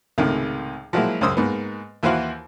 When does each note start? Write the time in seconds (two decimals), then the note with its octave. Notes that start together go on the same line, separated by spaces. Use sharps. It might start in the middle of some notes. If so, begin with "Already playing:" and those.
0.18 C#2 A2 C3 D#3 G#3
0.93 F3 F#3 G#3 A#3 E4
1.21 C#2 F#2 C5 D#6 E6
1.37 G#2 A#3 B3
2.03 D#2 E3 E4 F#4 C5 F5